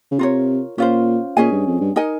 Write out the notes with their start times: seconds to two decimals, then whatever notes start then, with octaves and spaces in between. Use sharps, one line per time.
0.11 C#3
0.19 C3 F4 A#4 C#5
0.77 A#2 C#4 F4 C5
1.37 A#2 C#4 G#4 D#5 G#5
1.52 G2
1.66 F2
1.81 G2
1.96 D#4 A#4 D#5 G#5